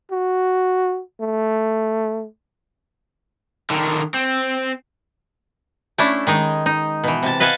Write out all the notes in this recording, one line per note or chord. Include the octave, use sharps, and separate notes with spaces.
F#4
A3
D3 D#3
C4
A3 C#4 D4 E4
D#3 G#3 D#4
D#4
B2 E3
C3 A5
B4 D#5 F5 F#5 G#5 A5